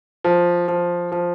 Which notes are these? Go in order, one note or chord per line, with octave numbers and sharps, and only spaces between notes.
F3
F3
F3